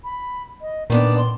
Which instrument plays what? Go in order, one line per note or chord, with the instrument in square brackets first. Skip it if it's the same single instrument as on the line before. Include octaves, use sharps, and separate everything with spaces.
[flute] B5
D#5
[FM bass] A#2 [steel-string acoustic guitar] D#3 B3 D4 [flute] D5
[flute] C6